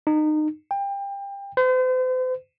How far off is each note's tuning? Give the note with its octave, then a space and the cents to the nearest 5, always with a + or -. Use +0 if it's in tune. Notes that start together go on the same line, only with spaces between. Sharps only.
D#4 -25
G5 +25
C5 -40